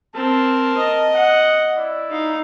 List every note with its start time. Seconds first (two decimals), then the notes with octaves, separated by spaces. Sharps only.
0.15 C4 A#4 A5
0.77 D#5 D#6
1.14 F#5
1.76 E4 D5
2.10 D#4 F5